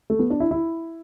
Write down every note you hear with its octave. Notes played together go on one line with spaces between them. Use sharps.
A3
B3
D4
E4
E4